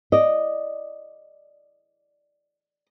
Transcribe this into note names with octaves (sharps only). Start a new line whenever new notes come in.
D5 D#5